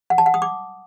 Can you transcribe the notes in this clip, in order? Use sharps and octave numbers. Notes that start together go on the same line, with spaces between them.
F#5
A5
F#5
D#6
D6